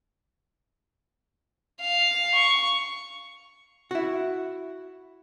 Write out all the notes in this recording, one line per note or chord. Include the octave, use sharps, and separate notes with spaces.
F5
C#6
E4 F#4